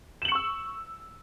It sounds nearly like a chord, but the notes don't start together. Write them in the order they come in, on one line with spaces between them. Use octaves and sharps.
E7 F#7 C#7 C#6 E6